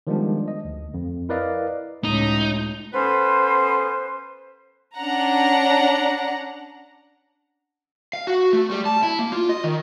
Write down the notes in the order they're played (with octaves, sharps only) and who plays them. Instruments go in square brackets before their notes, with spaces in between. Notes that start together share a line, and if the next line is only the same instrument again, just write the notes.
[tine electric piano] D#3 F3 G3 G#3 B3 D4
D#5
D2
F2
E4 A#4 B4 D5 D#5 F5
[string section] C#2 A2 [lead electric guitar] D#4
[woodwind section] B3 C#4 A4 B4 C5
[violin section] C#4 D4 F#5 A#5
[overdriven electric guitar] F5
F#4
A3
G3
A5
E4
A#3
F4
D#5
D#3